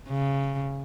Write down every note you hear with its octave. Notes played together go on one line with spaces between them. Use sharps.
C#3